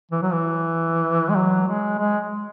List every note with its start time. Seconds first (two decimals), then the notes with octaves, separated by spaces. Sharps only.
0.11 E3
0.22 F#3
0.33 E3
1.29 G#3
1.36 F#3
1.68 G#3
1.99 G#3